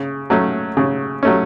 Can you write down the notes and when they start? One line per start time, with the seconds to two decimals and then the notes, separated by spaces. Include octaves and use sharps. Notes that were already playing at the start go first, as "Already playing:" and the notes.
Already playing: C#3
0.30 F#3 A3 C#4
0.77 C#3
1.23 F#3 A3 C#4